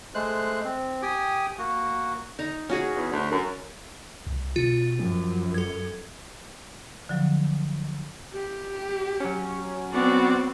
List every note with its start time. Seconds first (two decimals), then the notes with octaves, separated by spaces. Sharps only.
0.15 G#3 A3 C5 F#6
0.64 C4
1.02 G4 G5 G#5 D#6
1.58 A#3 F#4
2.39 D#4 A#5
2.69 C#4 F#4 G#4
2.95 E2
3.12 D2
3.31 F#2
4.27 C2
4.56 B2 F4
4.99 F#2 F3
5.54 A4 G#6
7.09 D3 F3 F#3
8.33 G4
9.20 F#3 C#4
9.92 B3 C4 F#4 D5